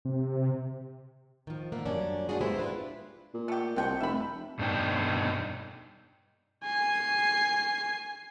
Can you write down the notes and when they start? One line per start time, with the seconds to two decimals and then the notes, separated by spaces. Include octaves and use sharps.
0.05 C3
1.47 D#3 F3
1.72 D3 D#3 A#3 E5 F#5
1.86 F#2 G3 A#3 C#4 D4
2.29 A#3 D4 D#4 F4 F#4 G#4
2.41 G#3 B3 E4 G4 C5
2.58 D4 F4 B4
3.34 A#2
3.48 A3 G4
3.76 C2 B2 G5 C#6
4.00 F1 E5 B5
4.59 G2 B2 D4 D#4 G5
6.63 G#5 C7